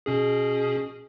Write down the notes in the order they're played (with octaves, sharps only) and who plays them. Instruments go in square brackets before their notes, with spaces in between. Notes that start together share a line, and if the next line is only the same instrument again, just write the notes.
[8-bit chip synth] B2 C#4 G#4